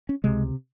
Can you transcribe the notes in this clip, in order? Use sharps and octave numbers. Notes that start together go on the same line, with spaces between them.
C#4
C#2 C3 G#3